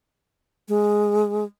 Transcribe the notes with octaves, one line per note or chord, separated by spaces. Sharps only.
G#3